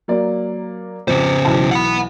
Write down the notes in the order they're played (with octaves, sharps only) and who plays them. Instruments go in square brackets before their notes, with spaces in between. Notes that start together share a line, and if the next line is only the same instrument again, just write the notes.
[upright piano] F#3 A#3 D5
[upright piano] F2 [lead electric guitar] C#3 C5
[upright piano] B1 E3 A5
[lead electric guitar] F#5 B5